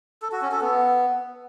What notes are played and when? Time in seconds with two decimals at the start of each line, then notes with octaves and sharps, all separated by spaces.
0.22 A4
0.32 F#4
0.42 C#4
0.52 A4
0.61 B3